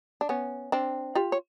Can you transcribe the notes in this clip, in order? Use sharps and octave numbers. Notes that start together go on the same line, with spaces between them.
D4
B3 C#4
C4 D4
F4 G4
C#5